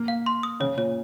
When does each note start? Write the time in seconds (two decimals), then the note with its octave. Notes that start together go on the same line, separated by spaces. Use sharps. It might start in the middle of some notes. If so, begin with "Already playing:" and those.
Already playing: A#3
0.08 F5
0.26 C6
0.43 D#6
0.60 C#3 C#5
0.77 A#2 C#5